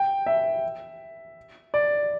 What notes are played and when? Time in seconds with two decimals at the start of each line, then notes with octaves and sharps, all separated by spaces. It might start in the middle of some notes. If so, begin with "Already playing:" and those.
Already playing: G5
0.27 E5
1.74 D5